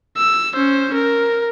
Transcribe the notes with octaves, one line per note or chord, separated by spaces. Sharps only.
E6
C#4 C5
A#4